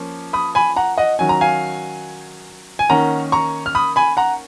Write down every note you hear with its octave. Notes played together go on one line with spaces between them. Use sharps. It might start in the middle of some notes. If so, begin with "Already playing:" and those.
Already playing: F3 A#3 C#4
B5 D#6
G#5 B5
F#5 A#5
D#5 F#5
D#3 F#3 C#4 G#5
A#5
F5 G#5
G#5
D#3 A#3 C#4 F#5 A#5
A#5 C#6
F6
B5 D#6
G#5 B5
F#5 A#5